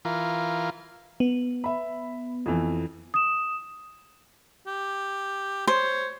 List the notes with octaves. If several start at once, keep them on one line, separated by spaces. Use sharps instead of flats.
E3 F4 A#4
B3
E5 B5
F2 E3
D#6 E7
G4
C5 C#5